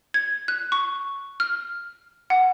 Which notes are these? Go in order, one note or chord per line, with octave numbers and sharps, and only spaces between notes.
G#6
F#6
C#6
F6
F#5